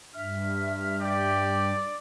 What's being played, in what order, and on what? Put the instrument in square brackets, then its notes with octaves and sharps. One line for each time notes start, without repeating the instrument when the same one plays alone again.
[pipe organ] G2 [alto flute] E5 [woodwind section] F6
[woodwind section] G4 G5 [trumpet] D5